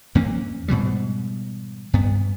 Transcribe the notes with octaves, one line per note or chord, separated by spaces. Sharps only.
F2 E3 A#3 C#4
G#2 B2 E3 G3
G2 B3